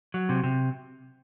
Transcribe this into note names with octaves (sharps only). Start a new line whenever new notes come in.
F#3
C3
C3